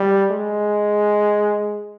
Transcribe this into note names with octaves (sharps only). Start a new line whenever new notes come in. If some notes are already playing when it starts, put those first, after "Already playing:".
Already playing: G3
G#3